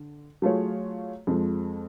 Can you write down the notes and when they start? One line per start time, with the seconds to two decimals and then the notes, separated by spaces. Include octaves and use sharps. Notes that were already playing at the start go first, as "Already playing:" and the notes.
Already playing: D3
0.42 F#3 A3 F4 G#4 C#5
1.27 F2 F3 G#3